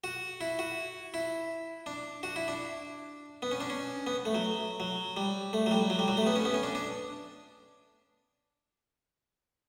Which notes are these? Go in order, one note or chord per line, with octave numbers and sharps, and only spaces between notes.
F#4
E4
F#4
E4
D4
F#4
E4
D4
B3
C#4
D4
C#4
B3
A3
F#3
F#3
G3
A3
F#3
G3
F#3
G3
F#3
A3
B3
C#4
B3
C#4
D4
D4